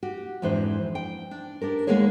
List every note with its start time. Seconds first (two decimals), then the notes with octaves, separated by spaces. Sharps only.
0.03 F#4 G4
0.42 F2 G#2 E3 D4 C5
0.95 G5
1.31 D4
1.61 D4 G4 A#4
1.87 D#2 G#3 A#3 B3 G#4 C#5